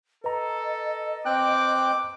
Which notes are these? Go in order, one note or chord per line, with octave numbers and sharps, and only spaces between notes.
A4 B4 D#5 A#5
C4 G5 D6 F#6